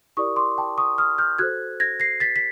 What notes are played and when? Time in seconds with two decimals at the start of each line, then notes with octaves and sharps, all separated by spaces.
0.17 E4 G4 A#4 D5 C#6 D#6
0.36 C6 D6
0.58 G5 A5
0.78 C#6 D#6
0.98 D#6 F6
1.18 F6 G6
1.39 F#4 A4 C5 F#6 G#6
1.80 G#6 A#6
2.00 A#6 C7
2.20 A6 B6
2.36 B6